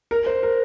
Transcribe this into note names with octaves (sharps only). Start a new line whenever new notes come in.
A#4
C5
A#4